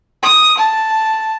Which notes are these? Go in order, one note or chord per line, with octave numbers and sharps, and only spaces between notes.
D#6
A5